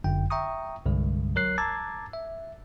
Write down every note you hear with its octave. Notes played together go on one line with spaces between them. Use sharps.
G1 F#2 D3 G5
E5 G5 A#5 C#6 D#6
C2 G2 D3 G#3
F#3 A#4 C#5 F#6 C7
A5 A#5 D6 E6 G#6 A6
E5